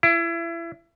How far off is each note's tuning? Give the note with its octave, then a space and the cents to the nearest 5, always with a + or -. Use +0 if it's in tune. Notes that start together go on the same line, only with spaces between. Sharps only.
E4 +30